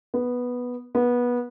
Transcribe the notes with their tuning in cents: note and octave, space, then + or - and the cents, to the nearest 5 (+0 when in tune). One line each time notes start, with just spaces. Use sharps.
B3 -5
B3 -20